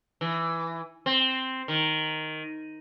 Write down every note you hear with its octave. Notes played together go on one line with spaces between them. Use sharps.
E3
C4
D#3